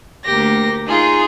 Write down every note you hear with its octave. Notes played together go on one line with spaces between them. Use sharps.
D2 A#3 G4 A#6
D#4 F4 G#4